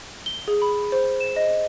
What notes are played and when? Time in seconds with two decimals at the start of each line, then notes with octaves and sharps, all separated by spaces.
0.26 G7
0.48 G#4
0.62 B5
0.92 C5
1.20 E7
1.36 D#5